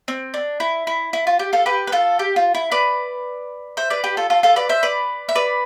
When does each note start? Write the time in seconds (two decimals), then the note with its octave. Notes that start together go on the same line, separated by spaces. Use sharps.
0.08 C4
0.34 D4
0.60 E4
0.87 E4
1.13 E4
1.27 F4
1.39 G4
1.53 F4 A4
1.66 G4 B4
1.87 B4
1.92 F4 A4
2.19 G4
2.36 F4
2.54 E4
2.72 B4 D5
3.77 C5 E5
3.90 B4 D5
4.04 G4 B4
4.17 F4 A4
4.30 F4 A4
4.43 F4 A4
4.56 B4 D5
4.69 C5 E5
4.83 B4 D5
5.29 E5
5.35 B4 D5